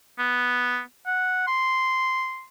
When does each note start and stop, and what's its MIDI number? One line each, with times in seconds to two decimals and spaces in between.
0.19 0.80 59
1.06 1.44 78
1.47 2.46 84